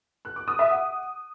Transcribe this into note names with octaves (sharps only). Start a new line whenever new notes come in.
F#6
D6
D#6
E5
F#5